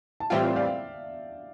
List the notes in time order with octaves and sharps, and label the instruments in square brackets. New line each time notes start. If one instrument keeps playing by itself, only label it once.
[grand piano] A5
[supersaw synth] A2 E3 G3 C4 F4 [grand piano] E5 G5
[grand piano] D5 F5